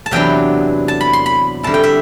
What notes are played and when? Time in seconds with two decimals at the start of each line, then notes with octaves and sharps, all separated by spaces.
0.06 A5
0.11 E2 C3 F#3 B3 D4 G5
0.88 A5
1.01 B5
1.13 C6
1.26 B5
1.63 D3 G3 C4 E4 A5
1.74 G5
1.83 E5